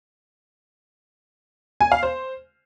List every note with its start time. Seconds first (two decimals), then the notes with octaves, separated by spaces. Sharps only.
1.81 G#5
1.92 F5
2.03 C5